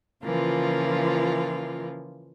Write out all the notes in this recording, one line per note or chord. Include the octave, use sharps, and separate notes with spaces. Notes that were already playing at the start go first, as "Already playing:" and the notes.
C#3 E3 F3 A#3 F4